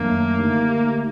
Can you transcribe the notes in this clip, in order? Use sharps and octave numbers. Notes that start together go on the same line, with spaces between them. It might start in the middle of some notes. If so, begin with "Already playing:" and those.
Already playing: F#2 D#3 F#3 A3 A#3 D4
D3 A3 D#4 G4